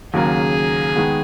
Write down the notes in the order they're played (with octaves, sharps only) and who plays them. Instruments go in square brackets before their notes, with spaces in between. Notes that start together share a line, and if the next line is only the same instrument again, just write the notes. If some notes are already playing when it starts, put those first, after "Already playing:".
[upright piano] D#2 C#3 F#3 A#3 [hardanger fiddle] G#4
[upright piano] D#3 G#3 B3